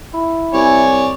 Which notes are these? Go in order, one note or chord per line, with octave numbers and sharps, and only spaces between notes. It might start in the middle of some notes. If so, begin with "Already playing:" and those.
E4
C2 C#5 D5 G#5 C#6